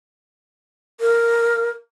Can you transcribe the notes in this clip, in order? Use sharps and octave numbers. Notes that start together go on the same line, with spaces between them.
A#4